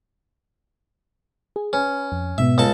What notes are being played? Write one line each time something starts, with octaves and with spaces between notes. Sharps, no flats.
G#4
C#4 B4
F2
G#2 B2 B3 E5
C#2 A4 A5